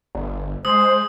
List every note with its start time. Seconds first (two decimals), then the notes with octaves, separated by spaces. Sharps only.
0.15 G1
0.65 G#3 C5 D#6